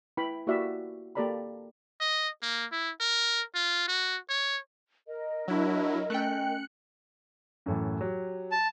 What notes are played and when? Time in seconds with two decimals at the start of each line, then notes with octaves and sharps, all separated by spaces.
0.17 E4 B4 G5 B5
0.47 A#3 E4 F#4 G4 D5 E5
1.15 A#3 G4 A4 D5 A#5 B5
2.01 D#5
2.42 A#3
2.72 E4
3.00 A#4
3.55 F4
3.88 F#4
4.29 C#5
5.08 A#4 D#5
5.48 F#3 D4 E4
6.10 A3 C#4 G5 F#6 C#7
7.66 F#2 A2 E3
8.01 F#3 G4
8.52 A5